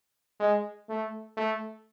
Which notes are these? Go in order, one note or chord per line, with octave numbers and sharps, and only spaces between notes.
G#3
A3
A3